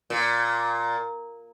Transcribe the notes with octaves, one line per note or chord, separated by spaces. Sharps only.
A#2